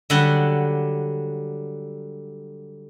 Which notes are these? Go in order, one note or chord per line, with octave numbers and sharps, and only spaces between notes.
D3 F#3 G3 F#5